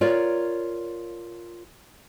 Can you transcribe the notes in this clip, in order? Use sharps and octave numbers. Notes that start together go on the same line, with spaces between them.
F4 A#4 C#5 D5